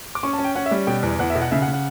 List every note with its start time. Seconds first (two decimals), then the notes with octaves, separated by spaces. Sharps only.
0.15 D6
0.23 C#4 C#6
0.33 A5
0.38 C#4
0.44 G5
0.55 C#4 F#5
0.66 E5
0.71 G3
0.87 B2 G5
1.03 E2
1.19 E2 F#5
1.30 E5
1.35 B2
1.42 F#5
1.51 C#3 E5
1.62 F#5
1.68 C#3
1.73 F#5